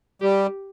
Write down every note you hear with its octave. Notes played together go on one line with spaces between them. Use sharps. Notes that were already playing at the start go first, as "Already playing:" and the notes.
G3 G4